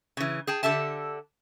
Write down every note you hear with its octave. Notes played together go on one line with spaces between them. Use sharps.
C#3 E3
G#4 G5 A5
D3 G4 A4 E5 A5